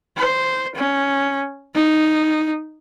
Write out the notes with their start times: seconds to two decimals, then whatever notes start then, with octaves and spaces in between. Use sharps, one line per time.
0.17 C5
0.76 C#4
1.75 D#4